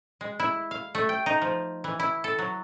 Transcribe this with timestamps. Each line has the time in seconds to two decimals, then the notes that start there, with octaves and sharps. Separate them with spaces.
0.21 G#3
0.40 E4
0.71 F5
0.95 A3
1.09 G5
1.26 D#4
1.41 F3
1.84 E3
1.99 E4
2.24 A4
2.39 F#3